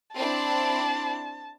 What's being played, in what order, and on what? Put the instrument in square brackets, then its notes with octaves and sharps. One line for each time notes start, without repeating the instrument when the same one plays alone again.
[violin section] C4 D4 E4 [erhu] A5